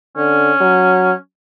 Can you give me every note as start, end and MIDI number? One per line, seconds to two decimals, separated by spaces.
0.17 0.52 50
0.17 1.15 61
0.61 1.12 54